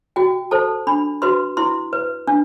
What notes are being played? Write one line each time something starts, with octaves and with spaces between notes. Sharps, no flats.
F#4 G5
A4 C5 A5
D4 B5
F#4 B4 C6
E4 C6
B4
D4